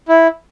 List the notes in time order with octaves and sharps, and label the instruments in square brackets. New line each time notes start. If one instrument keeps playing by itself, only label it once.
[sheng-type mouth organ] E4